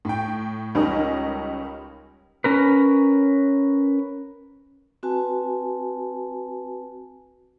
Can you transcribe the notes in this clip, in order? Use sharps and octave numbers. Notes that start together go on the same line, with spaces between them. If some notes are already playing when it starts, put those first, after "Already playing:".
A2 G5
C#2 G3 C#4 D#4 A#4 D#5
C#4 A#4 B4
C4 F#4 B4 G#5 A5